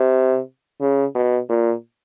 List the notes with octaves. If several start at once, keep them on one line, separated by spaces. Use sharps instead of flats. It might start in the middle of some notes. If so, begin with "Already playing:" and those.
Already playing: C3
C#3
B2
A#2